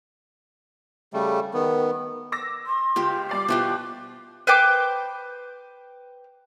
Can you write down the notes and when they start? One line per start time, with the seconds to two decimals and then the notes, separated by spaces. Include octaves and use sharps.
1.13 C#3 G3 A3
1.54 D#3 B3
2.32 D6 E6 A#6
2.66 C6
2.96 C#2 F4 G4
3.29 G3 D5 D6 C7
3.48 B2 E4 F4 G4 C5 F#6
4.47 B4 C5 G5 D6